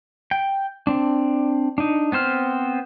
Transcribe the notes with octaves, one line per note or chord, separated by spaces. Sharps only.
G5
C4 D4
D4 D#4
B3 C4 C5 F6